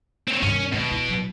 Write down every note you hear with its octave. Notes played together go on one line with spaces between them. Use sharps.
C4 C#5
G2 D#3 C#4
B2 G#3
E4
F#3